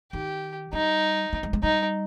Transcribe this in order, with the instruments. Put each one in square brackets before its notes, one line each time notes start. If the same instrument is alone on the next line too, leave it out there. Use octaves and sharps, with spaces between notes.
[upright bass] D#3 [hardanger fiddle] G4
[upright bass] G3 [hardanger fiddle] D#4
[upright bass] A#3
G#3
G#3
[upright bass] G3 [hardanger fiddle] D#4